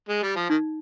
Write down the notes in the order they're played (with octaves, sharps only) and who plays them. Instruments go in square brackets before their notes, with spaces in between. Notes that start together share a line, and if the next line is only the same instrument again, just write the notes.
[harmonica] G#3
G3
F3
[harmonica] D#3 [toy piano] D#4